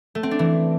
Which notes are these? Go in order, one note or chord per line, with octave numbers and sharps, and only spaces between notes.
A3
C4
D4
E3